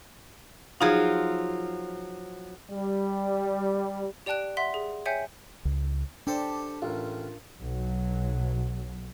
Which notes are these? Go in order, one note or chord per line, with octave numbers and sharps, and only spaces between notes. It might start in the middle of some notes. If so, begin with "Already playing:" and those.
F3 F#3 D#4 F4 G#4
G3
G4 D5 G5 A5 F#6 D7
E5 F#5 C6 B6
G#4
C#5 E5 G5 G#5 G6 C#7
C#2
D4 G4 A4 C5
A1 F4 A#4
B1 F#3